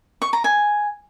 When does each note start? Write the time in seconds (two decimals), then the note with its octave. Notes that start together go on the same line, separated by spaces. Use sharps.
0.22 C#6
0.33 A#5
0.44 G#5